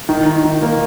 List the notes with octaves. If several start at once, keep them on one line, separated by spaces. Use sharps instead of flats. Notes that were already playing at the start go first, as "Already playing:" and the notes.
D#3
D#3
D#3
A#3